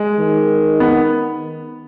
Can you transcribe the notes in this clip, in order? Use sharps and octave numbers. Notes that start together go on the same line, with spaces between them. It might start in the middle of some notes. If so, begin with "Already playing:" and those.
Already playing: G#3
D#3
B3